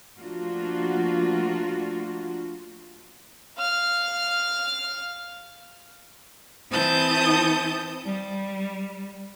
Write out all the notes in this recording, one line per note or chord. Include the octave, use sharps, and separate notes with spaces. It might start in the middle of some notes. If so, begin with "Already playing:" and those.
F3 A3 A#3 D4 F4 F#4
F5 F6
E3 C4 A5 D#6 G6
G3